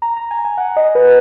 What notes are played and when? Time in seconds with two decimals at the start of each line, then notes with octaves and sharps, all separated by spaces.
0.02 A#5
0.17 A#5
0.31 G#5
0.45 G#5
0.58 F#5
0.76 D#5
0.95 B4